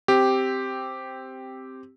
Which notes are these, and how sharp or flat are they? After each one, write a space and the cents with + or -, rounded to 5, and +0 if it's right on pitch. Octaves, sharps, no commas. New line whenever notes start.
C4 +0 G4 +0